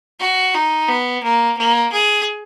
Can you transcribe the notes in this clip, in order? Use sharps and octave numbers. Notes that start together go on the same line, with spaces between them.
F#4
D#4
B3
A#3
A#3
G#4